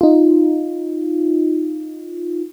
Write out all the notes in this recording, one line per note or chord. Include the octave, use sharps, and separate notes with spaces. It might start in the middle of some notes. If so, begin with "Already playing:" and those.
D#4 F4